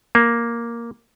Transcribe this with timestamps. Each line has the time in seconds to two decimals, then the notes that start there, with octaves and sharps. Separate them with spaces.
0.15 A#3